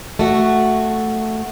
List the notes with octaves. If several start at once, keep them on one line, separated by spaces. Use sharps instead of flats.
A3 F#4